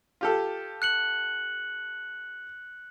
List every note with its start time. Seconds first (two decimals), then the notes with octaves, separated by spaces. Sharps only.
0.21 F4 G4 A4
0.82 F#6 C#7 F#7